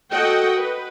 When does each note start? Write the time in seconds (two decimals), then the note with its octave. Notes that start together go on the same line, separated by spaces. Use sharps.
0.10 F#4 A4 D#5 F#5 G5
0.59 B4